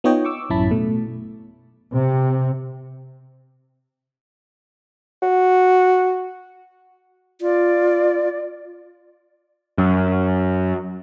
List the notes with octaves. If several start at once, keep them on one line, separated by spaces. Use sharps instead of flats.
B3 D#4 F4 C#5 D#5 G5
C#6 D6 E6
A1 F#2 C#4 E4 A5 B5
B2 A3
C3
F#4
F4 D5
F#2